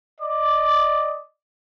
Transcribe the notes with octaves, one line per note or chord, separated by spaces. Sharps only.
D5 D#5 D6